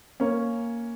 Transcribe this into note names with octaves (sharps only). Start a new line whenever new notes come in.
A#3 C#4